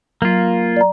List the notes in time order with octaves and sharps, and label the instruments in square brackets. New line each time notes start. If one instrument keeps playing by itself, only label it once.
[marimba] F#3 [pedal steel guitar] A#3 F4
[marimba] D5 A#5